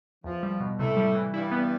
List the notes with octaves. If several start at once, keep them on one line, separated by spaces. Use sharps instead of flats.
E2 F3
G3
B2
A2 C3 A3
G3
E3
G2 G3 E4
B3